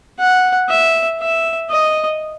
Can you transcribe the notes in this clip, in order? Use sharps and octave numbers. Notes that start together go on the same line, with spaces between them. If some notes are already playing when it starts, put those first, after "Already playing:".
F#5
E5
E5
D#5